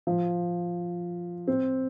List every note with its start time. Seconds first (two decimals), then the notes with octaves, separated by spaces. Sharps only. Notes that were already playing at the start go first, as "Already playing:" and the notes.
0.07 F3
1.47 C4